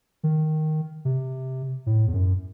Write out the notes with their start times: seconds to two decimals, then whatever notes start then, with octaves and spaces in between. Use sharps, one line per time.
0.23 D#3
1.05 C3
1.86 A2
2.07 E2
2.14 F#2